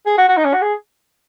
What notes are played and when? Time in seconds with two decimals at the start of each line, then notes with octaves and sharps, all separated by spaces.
0.06 G#4
0.18 F#4
0.28 F#4
0.37 D#4
0.45 C#4
0.53 F#4
0.62 G#4